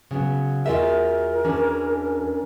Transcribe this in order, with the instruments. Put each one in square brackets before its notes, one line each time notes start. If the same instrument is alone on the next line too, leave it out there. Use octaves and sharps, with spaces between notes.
[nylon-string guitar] C#3 F#3 B3
[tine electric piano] E2 F#4 G#4 [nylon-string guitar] F4 D#5 E5 [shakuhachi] A#4
[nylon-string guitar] E3 C#4 D4